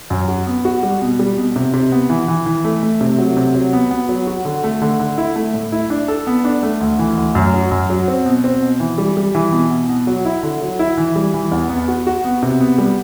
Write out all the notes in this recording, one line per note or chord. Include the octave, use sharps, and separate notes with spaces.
F#2
F#4
B3
F#4
G3
B2
G3
B2
C3
C3
B3
E3
E3
E3
A3
A3
C3
F#3
C3
F#3
B3
B3
F#3
F#4
D3
A3
D3
D3
E4
A3
A2
E4
D4
A4
B3
D4
A3
D2
E3
D2
F#2
F#3
F#2
F#3
C4
B2
C4
B2
E3
G3
G3
E3
B2
B2
B2
F#3
E4
D3
F#3
E4
E3
G3
E3
E2
B3
F#4
F#4
B3
C3
B3
G3